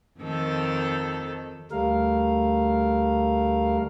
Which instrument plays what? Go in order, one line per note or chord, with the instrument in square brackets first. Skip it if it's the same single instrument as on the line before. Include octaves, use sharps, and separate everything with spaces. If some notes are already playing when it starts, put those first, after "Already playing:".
[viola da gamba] F2 D#3 A4
[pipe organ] D2 G3 A3 A#4 F5